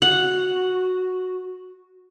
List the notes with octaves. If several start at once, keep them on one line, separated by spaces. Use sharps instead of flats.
F#4 F#5